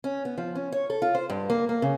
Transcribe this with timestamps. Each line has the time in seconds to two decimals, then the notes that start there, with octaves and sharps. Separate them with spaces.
0.04 C#4
0.25 B3
0.38 F3
0.55 C#4
0.72 C#5
0.90 A4
1.02 F4
1.15 C5
1.30 G2
1.50 A#3
1.69 A#3
1.82 C#3